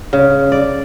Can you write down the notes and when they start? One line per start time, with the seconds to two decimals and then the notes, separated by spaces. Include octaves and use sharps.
0.13 C#3
0.52 D5